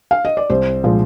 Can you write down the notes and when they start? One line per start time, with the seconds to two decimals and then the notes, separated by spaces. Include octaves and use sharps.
0.11 F5
0.25 D#5
0.37 D5
0.50 C2 C5
0.84 A#2 F3 G#3